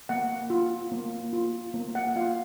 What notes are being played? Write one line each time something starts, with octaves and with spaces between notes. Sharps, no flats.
A#3 F#5
F4
A#3
F4
A#3
F#5
F4 F5